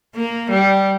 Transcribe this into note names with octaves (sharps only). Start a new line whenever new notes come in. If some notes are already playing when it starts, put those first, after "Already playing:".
A#3
G3